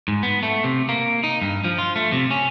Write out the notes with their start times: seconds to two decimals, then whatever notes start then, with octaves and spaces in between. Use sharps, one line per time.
0.08 G#2
0.23 B3
0.43 A3
0.64 C3
0.89 A#3
1.24 D#4
1.42 G2
1.64 F3
1.79 F4
1.96 A3
2.12 C3
2.31 C#4